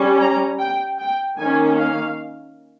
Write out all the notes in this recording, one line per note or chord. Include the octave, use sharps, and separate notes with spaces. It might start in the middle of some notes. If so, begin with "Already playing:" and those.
Already playing: G3 C#4
A#5
G5
G5
D#3 A#3 C#4 G#5
F5